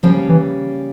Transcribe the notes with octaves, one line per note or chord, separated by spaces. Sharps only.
C#3 F3 G3 A#3 C#4
E3